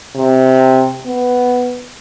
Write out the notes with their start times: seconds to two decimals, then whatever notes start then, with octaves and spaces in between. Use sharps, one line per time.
0.15 C3
1.06 B3